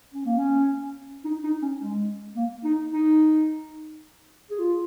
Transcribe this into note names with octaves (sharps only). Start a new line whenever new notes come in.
C#4
A#3
C#4
D#4
D#4
C#4
G#3
A#3
D#4
D#4
G#4
F4